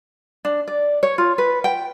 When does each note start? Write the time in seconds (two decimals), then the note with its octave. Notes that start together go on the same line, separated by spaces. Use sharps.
0.45 D4
0.68 D5
1.03 C#5
1.18 F4
1.38 B4
1.64 G5